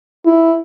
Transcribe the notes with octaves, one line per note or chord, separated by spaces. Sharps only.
E4